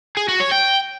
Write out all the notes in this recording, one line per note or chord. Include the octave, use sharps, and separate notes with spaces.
G#4
F#4
C#5
G5